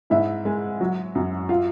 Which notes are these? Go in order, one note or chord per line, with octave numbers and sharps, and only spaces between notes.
G#2 E4 E5
G#3
F#3
F#2
F4 F5